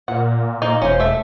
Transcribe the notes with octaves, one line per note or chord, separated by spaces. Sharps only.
A#2 F#5
A#2 A#3 D#4
E1 C#4 F4 C5
A3 E5